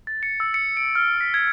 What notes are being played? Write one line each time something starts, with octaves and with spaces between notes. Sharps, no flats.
A6
C#7
E6
C#7
D7
F6
B6
G#6